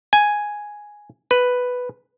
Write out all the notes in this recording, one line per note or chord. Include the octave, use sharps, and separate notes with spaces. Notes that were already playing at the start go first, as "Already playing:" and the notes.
G#5
B4